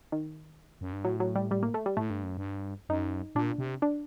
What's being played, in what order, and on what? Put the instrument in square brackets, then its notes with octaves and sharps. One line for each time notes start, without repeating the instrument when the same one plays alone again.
[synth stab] D#3
[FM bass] F#2
G2
[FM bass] A2 [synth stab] F#3
[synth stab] F#3
G3
G3
A#3
A3
G3
[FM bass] A2 [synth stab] A3
[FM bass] G2
F#2
G2
[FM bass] F#2 [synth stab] D#4
[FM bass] A#2 [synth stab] D4
[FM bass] C3
[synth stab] D4